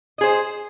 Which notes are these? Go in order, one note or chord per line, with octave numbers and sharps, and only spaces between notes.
G#4 C5 D#5